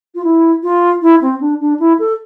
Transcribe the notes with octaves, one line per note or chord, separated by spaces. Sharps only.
F4
E4
F4
E4
C4
D4
D4
E4
A4